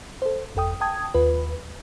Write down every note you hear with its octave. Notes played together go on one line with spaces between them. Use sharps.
A4 C5
G1 F2 A4 G5 D#6
G5 A5 D#6 G#6
D#2 F4 B4